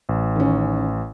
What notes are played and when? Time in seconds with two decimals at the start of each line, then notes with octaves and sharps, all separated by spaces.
0.09 A1
0.36 D#3 C#4